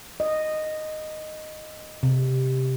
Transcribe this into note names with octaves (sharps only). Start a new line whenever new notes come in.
D#5
C3